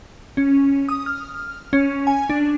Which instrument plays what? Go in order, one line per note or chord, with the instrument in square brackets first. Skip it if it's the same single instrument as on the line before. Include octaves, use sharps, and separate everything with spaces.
[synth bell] C#4
D#6
F6
C#4
G#5
D4